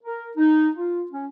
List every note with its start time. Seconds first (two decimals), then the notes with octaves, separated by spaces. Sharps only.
0.03 A#4
0.36 D#4
0.75 F4
1.11 C#4